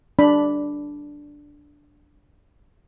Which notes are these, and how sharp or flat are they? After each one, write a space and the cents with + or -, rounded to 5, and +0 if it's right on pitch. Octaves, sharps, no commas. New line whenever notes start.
D4 +0 B5 +0